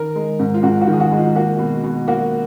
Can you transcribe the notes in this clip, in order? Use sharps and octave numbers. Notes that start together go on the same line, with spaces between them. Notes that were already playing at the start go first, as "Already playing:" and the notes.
Already playing: D#3 A#4
G#3
G#2
F4
G#2 F#4
F#4
D#3
G#4
F#4
G#3
F4
A#3 F#4
B2
B2
A#3 F#4